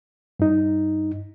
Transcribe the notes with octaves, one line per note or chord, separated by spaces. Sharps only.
G2 D#4